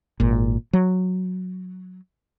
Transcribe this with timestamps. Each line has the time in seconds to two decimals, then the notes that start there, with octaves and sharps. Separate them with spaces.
0.20 G#1 A#2
0.73 F#3